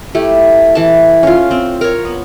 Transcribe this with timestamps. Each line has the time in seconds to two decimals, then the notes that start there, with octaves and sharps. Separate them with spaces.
0.15 A3 E4 G4
0.75 E3 A5
1.23 C#4 F4
1.51 C4
1.81 A#4 C#5
2.05 B3